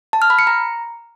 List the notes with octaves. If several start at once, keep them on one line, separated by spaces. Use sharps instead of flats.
A5
F6
B5
C#7
A#5